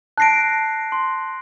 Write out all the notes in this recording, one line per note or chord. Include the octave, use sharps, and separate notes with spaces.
A5 F#6 A#6 C7 D7
C6